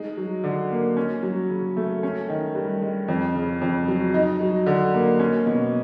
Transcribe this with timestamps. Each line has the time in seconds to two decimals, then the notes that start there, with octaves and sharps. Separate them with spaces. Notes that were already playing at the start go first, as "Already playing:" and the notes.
Already playing: G#3 D#4
0.17 F#3
0.44 D3
0.71 A#3
0.97 C#4
1.23 F#3
1.50 C#3
1.77 A3
2.03 C#4
2.29 D#3
2.55 G2
2.81 G#3
3.08 F2
3.35 C#3
3.61 F2
3.88 F#3
4.14 D#4
4.41 F#3
4.66 D3
4.94 A#3
5.19 C#4
5.46 B2